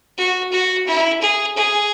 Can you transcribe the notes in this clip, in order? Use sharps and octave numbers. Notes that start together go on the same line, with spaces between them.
F#4
F#4
E4
G#4
G#4